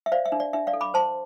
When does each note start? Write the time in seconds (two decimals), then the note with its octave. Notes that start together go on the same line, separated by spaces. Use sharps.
0.06 E5
0.12 C5 D5 F5
0.26 E5
0.32 D4
0.40 D5
0.53 D4 E5
0.67 D5 F5
0.73 A4
0.81 B5 D6
0.94 C5 A5 C6